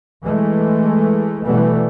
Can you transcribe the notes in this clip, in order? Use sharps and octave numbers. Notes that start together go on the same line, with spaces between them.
E3 G#3 A3
B2 E3 G3 A3 B3